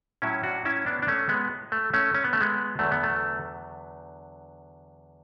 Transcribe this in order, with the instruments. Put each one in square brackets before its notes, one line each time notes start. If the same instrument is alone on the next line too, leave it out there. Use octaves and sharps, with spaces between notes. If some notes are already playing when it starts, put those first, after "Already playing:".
[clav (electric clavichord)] A2 F#3 C#4 E4
D4 F#4
C#4 E4
B3 D4
D4
A3 C#4
G#3 B3
A3
A3 C#4
C#4
B3
A3
G#3 B3
E2 D3 F#3 A3
B3
A3